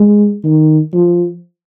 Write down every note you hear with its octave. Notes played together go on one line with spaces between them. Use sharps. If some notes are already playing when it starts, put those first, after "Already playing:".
Already playing: G#3
D#3
F3